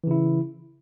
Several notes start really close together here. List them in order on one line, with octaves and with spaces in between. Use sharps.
E3 C#3 E4